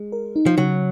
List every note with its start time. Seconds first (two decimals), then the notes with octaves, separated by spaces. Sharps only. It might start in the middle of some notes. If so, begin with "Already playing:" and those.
Already playing: G#3
0.12 A#4
0.36 D#4
0.46 F3
0.58 C#3 F#3